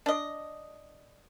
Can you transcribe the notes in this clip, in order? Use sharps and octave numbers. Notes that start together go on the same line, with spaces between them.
D4 D#5